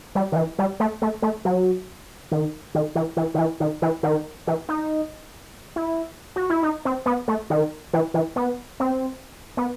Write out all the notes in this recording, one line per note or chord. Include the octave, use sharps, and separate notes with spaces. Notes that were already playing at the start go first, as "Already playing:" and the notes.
G3
D#3
E3
G3
A3
A3
A3
F#3
D#3
D#3
E3
E3
D#3
E3
D#3
E3
D#3
E3
D#4
E4
F#4
E4
D#4
C4
B3
A3
D#3
E3
E3
B3
C4
B3